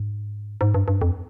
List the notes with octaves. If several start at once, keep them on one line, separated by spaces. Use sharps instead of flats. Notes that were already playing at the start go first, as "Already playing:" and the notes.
Already playing: G#2
G#2
G2
G2
F2